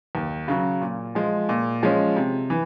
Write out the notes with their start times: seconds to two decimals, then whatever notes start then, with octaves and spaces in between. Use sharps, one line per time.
0.15 D#2
0.48 C#3 F#3
0.81 A#2
1.15 F3 G#3
1.49 A#2
1.83 F3 G#3 C#4
2.16 C3
2.50 E3